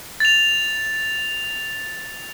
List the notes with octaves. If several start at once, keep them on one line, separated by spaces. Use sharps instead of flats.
A6 F7